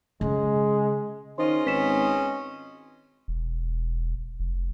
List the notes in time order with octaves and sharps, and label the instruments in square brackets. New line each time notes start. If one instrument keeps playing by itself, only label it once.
[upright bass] C#3 [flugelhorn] G#3
[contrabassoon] D#3 [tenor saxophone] C#4 [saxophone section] F4 G#4 D#5 [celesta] C5 C6
[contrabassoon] G#1 [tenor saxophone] C#4 [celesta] B4 B6 E7
[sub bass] E1
F1